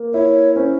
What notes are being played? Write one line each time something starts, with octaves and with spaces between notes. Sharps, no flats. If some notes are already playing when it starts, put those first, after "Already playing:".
Already playing: A#3
E4 C#5
C#4 C5